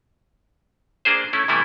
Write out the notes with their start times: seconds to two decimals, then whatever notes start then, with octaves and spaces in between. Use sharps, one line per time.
1.05 A#3 D4 G#4 C5
1.33 A3 C#4 E4
1.48 C3 E3 G3 A3 B3 E4